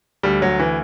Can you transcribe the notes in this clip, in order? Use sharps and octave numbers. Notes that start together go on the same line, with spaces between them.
D2 G3
F#3
E3